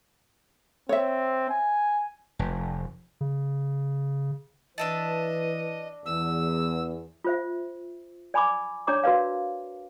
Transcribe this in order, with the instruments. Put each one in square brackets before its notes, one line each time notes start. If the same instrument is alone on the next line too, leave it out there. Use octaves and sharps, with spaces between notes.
[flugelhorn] C4 [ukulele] C#5 E5
[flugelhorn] G#5
[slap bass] F1
[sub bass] C#3
[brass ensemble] E3 B4 [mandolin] D4 E5 A5 [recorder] D#5
[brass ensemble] E2 [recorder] E6
[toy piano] F4 C5 E5
D5 G#5 B5 C#6 D6
D4 C#5 D5 A#5 C#6 D6
F#4 A#4 B4 D5 F5